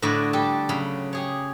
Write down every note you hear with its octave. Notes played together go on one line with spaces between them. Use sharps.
A2 D3 F#4 D5 D#5 B5
G3 G4 A4
C#3 F#3 B5
G4 G#4 C#5